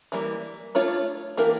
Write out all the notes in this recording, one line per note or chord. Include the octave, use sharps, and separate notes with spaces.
E3 G3 A#3
A3 D4 F4 C#5
E3 A#3 D4 G4 A#4